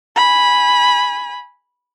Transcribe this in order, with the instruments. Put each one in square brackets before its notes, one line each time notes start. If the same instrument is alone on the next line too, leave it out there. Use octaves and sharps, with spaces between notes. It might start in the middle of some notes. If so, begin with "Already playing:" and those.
[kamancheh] G#5 B5